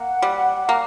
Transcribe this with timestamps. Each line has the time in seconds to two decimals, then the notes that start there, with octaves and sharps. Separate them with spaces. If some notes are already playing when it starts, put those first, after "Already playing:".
Already playing: A#3 F#5
0.22 G3
0.69 A#3